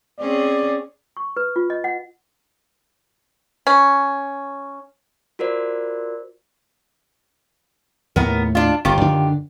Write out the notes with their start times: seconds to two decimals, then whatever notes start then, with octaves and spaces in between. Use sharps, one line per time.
0.20 C4 C#4 G#4 D5
1.17 C#6
1.37 B4
1.56 F4
1.70 D#5
1.84 F#5
3.67 C#4
5.39 F4 F#4 A#4 C5 D5
8.16 D#2 A2 A3 B3 A#4
8.55 D4 F4
8.85 G1 D#3 F4 G4
9.01 F#2 D3 D4